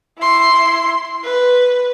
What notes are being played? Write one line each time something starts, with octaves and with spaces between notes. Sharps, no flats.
E4 C6
B4